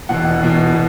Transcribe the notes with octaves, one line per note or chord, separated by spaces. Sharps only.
E1 E2 B2 F#5
E1 E2 B2
B2